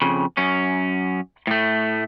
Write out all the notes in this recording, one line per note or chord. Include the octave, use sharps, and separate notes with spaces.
F2 C#3
F#2 C#4
A2 A3